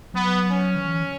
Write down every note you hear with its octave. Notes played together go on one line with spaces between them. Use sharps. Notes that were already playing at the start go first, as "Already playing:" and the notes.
F#3 B3
C#4
D#3
E3
D#3